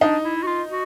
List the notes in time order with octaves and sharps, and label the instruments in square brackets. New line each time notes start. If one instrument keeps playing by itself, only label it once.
[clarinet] D4 [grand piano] D#4
[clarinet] E4
F#4
F4
F#4